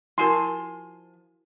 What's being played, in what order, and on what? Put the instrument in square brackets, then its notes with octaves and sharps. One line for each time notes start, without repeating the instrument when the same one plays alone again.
[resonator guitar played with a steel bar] F3 G#5 A5 [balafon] E4 F#4 A#4 [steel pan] C6